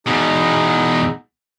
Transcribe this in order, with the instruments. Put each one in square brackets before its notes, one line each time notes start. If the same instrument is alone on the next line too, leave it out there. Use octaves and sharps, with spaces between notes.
[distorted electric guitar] E2 B2 [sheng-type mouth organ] D#4 G#4